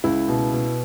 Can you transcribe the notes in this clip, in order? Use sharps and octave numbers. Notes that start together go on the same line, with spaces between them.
C#2 E4
B2
B2